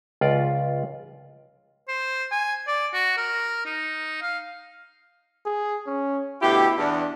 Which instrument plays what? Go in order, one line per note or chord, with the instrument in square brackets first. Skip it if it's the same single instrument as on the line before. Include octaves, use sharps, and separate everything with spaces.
[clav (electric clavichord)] C#2 F4 D5
[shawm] C5
G#5
D5
F#4
A#4
D#4
F5
[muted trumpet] G#4
C#4
[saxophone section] D2 B2 G4 [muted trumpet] E4
[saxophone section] E2 [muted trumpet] D4